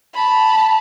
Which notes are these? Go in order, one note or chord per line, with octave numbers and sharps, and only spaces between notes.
A5 B5